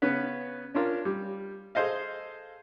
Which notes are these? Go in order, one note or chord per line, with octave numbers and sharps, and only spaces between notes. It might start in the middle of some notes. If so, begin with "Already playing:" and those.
C#3 B3 C#4 B4
C#4 D4 F4 A#4
G3
G#4 A4 C5 D#5 F5